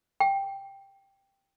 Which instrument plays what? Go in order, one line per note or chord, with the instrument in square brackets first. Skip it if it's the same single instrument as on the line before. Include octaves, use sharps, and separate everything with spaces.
[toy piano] G5